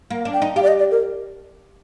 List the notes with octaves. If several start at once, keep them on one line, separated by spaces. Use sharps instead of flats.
A#3
D4
G5
D#4
G4 F5
D5
D#5
D5
A#4